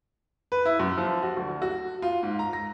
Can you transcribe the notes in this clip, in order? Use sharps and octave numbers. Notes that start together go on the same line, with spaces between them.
B4
E4
F#2
F3
F#4
D2
F#4
F4
G#2
A#5
A#6